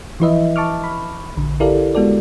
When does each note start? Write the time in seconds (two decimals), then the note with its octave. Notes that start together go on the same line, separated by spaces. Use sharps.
0.20 E3 F3 E4 B4 D#5 E5
0.56 A5 C#6 D6 F6
0.84 B5
1.37 A#1 D3
1.60 E4 G4 A4 A#4 D5 F5
1.95 G#3 B3 F#4 A4 D5